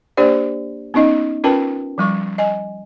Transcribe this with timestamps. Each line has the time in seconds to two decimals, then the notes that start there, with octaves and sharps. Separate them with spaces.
0.17 A#3 D4 G4 C5 D5
0.94 B3 C#4 D#4 D#5
1.44 C#4 F4 A#4 B4 G5 A5
1.98 F3 G3 C#6
2.38 D#5 G#5